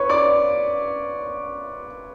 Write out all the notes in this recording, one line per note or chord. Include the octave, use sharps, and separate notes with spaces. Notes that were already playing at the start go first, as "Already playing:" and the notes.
Already playing: B4 C#5 C#6
D5 D6